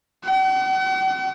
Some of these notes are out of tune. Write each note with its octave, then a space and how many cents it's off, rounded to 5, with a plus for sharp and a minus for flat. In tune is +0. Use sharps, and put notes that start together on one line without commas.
F#5 +45